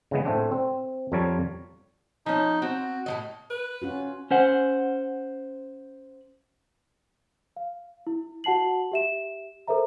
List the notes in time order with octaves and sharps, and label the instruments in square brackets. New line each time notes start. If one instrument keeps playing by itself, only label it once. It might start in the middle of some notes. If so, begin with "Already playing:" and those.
[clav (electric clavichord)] C#3 E3 G#3 B3
A2 A3 C4 D4
C4
F2 F3 G3 A#4 C#5 A5
[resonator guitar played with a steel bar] F3 C#4 [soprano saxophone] D#4
[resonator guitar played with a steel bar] C4 [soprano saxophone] F#4
[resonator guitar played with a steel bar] A2 F#3 D#5
[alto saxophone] B4
[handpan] C#4 F4 F#4
[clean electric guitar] C#4 C5 F#5
[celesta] F5
E4
F#4 F#5 A5 C7 F#7
G4 E5 E7
A4 A#4 C5 E5 A#5